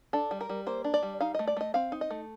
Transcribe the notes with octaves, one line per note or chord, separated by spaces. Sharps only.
D4 A4
G3
A#4
G3
A#3 C5
D4
D5
G3
D#4 F5
A3 D#5
D5
A3 D#5
C4 F5
D#4
D#5
A3